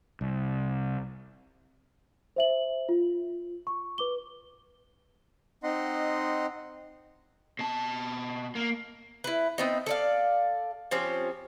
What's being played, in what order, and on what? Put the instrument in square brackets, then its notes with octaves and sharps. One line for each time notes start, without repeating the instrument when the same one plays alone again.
[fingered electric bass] C2
[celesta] C5 E5 F#7
F4
C#6
B4 D6 G7
[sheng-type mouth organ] C4 D#4 D#5 F#5 C6
[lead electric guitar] B2 A5
A#3
[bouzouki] E4 B4
B3 C4 D#4
A4 D5 F5
F3 C4 C#4 G4